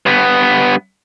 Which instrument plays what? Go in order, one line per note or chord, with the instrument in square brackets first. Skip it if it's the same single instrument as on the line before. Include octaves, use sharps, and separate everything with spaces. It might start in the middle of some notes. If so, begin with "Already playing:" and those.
[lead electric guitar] G2 B3